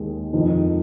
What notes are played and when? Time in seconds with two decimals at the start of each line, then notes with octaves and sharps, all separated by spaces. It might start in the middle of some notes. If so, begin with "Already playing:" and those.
Already playing: D#2 D#3 G#3
0.33 F2 D#3 G#3 C4 D#4